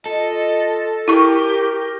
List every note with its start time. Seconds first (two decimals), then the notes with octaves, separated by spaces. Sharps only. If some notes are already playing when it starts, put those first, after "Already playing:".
0.06 F4 A4 D#5
1.08 E4 G4 A#4 C#6